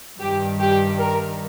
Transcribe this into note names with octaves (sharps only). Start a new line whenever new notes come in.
G2 D#3 G4
G4
A#4